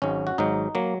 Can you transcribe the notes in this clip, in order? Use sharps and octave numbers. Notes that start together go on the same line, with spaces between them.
G#1 G#2 F#3 C#4
F#4
G#1 G#2 F#3 D#4
F#3 A#3